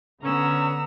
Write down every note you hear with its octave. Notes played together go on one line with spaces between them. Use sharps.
D3 B3 C#4 A#5 E6